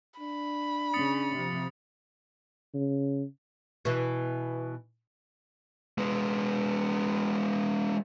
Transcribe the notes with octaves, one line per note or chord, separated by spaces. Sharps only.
D4 B5
C#3 C#4 D#6 A6 C#7
C3 F3
C#3
B2 E3
G#3 B3